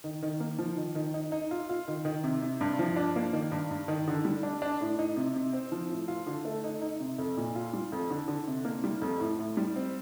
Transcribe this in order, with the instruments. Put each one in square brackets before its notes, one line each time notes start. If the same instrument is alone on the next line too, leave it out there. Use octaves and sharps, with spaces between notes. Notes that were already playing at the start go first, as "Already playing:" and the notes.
[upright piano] D#3
D#3
A#3
F3
D#3
D#3
D#4
D#4
F4
F4
D#3
D#3
C3
C3
G2
F3
D4
A#3
D#3
G2
G2
D#3
D3
G3
D4
D4
A2
D#4
C3
C3
C4
F3
A2
F4
D3
A3
D#4
D#4
C3
F2
A#2
F4
G3
F2
D3
D3
C3
A#3
G3
F2
A2
A2
G3
C4